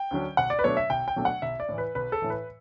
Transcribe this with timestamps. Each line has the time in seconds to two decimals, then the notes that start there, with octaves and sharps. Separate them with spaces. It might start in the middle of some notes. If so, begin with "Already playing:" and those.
Already playing: G5
0.11 D2 D3 F#3 C#4
0.37 B1 F#5
0.50 D5
0.59 B4
0.64 B2 F#3 A3 D4 C#5
0.77 E5
0.90 B1 G5
1.08 G5
1.16 B2 F#3 A3 D4
1.25 F#5
1.42 B1 E5
1.60 D5
1.69 A2 E3
1.78 B4
1.95 B1 B4
2.12 A4
2.22 A2 E3
2.30 B4